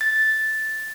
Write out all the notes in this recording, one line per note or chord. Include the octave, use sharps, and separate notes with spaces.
A6